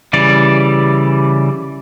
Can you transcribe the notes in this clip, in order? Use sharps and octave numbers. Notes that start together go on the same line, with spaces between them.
C#3 E3 G3 D5